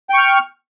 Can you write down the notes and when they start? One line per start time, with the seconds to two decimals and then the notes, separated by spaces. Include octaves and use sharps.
0.10 G5
0.14 C#6
0.18 F6